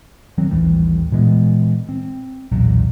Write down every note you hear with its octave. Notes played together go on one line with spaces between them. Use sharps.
D#3 F#3 C4
A1 D#2 E3 G3
A#2 E3 G#3 B3
C4
B1 E2 A#2 F#3